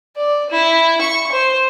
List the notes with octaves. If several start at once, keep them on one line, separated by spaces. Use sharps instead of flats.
D5
E4
C#6
C5